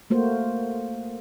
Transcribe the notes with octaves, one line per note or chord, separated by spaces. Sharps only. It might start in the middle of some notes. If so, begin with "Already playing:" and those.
A3 A#3 F#4 C5